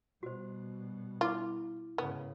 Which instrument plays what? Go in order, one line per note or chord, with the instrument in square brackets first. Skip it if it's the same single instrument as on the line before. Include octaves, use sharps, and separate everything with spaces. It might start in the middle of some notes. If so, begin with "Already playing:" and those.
[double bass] B2 G3 [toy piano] F#4 C5
[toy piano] E4 D6 [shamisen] F4
[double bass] G#2 C#3 [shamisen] B3